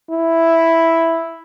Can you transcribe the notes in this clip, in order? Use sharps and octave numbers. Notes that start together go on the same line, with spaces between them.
E4